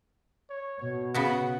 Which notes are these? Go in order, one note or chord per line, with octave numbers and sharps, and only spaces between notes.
C#5
B2 C#5
C#3 B3 F#4 F#5